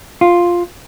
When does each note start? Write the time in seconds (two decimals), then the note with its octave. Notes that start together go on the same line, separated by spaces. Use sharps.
0.21 F4